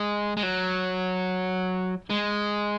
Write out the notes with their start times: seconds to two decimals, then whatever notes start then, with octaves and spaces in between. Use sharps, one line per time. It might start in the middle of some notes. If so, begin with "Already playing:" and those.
Already playing: G#3
0.37 G#3
0.43 F#3
2.10 G#3